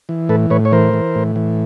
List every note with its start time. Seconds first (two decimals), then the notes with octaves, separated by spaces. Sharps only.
0.09 E3
0.29 A2 A4 B4
0.50 A2 B4 C#5
0.65 C#5
0.72 E3 A#4 C5
0.94 E3
1.15 A2
1.36 E3